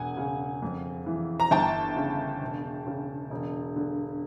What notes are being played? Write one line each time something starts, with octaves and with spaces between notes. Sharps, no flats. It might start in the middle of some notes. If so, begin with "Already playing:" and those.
Already playing: E1 F#5 G#5
C#3
F2
E3
A#5
G1 G5 A5
C#3
E1
C#3
E1
D3